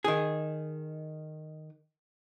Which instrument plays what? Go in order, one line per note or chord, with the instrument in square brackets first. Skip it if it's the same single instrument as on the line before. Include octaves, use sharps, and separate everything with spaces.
[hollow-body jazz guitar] D#3 G#4